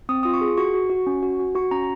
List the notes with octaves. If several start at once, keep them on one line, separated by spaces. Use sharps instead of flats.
C4 D#6
F4 D#6
C#6
G#4
F#4 C#6
F#4
F#4
C#4
F#4
F#4
F#4 C#6
C#4 A#5